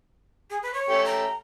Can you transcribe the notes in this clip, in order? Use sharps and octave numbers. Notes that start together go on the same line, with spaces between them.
G#4
B4
C#5
A3 C#4 G4
A#5